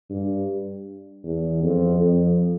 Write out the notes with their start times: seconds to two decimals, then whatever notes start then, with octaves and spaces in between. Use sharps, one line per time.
0.10 G2
1.24 E2
1.62 F2
2.00 F2